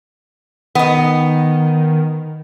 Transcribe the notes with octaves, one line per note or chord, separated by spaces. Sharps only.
D#3 B3 D#4